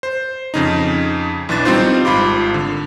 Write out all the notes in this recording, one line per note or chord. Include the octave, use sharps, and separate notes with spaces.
C5
F2 C#3 D#4
B1 E3 D4 A6
G3 C4 D#4 F4 C5
G#1 F4 B5 D6
D3